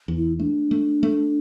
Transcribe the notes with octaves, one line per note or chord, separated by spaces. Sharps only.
E2
E4
A3 D4
A3
A3